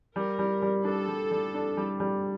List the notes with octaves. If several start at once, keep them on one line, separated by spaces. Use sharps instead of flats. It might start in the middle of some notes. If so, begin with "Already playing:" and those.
G3 A#4
G3
G3
D4 A4
G3
G3
D4
G3
G3